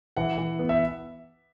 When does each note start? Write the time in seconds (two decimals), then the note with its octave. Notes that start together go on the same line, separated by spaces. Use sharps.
0.17 E3 F#5
0.38 E3
0.59 B3
0.69 E5